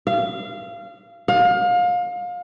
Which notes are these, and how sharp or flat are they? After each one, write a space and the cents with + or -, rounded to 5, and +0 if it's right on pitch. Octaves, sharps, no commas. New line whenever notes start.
F5 -25
F5 +30